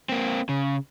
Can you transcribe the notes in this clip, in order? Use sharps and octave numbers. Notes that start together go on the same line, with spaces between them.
A#3 C4
C#3